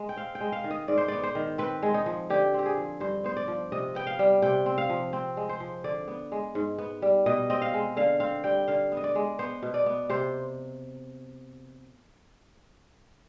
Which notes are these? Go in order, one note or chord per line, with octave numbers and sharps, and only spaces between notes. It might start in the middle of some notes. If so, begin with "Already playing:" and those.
Already playing: G#3
G5
C4 F5
G5
G#3
F5
D#3
D#5
G#2 D5
C5
B3 D5
C5
D#3
C4 B4
G#3
D#4
F3
D3 G4
C4 G4
G#4
F3
G2 C5
B3 C5
D5
F3
C3 D#5
B3 G5
F5
G3
C3 G5
C4
F5
F3
C4
G#3
C5
F3
D3 D5
B3
G#3
G#2
B3
G3
B2 D#5
C4 D#5
F5
G#3
D3 F5
C4 F5
G3 G5
D3 F5
B3
D#5
D5
G#3
B3 C5
B2
D5
B3
C3 C5